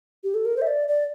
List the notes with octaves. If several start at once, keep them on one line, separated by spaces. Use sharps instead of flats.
G4
A4
A#4
C5
E5
D5
D5